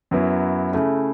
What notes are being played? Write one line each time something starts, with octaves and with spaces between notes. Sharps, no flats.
F#2 F#3 B3 E4
C#3 A3 E4